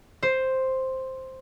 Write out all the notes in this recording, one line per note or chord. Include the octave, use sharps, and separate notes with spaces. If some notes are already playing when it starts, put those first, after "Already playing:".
C5